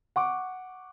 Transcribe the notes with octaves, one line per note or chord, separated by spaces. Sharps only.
F#5 C#6 D6